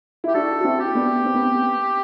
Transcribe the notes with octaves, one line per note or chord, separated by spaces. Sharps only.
E4 G4
D4 F#4 A4
F#4
C4 E4
G4
B3 D4
C4
B3
C4